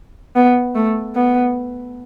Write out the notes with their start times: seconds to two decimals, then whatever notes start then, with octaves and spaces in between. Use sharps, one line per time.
0.36 B3
0.75 A3
1.15 B3